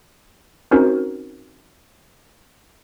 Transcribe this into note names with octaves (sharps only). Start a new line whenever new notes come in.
C4 C#4 D#4 F#4 A#4 C5